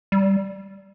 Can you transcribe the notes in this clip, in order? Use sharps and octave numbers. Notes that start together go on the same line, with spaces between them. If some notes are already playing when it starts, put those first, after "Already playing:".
G3